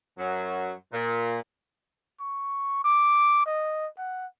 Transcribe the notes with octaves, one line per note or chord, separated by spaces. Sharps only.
F#2 F#3
A#2
C#6
D6
D#5
F#5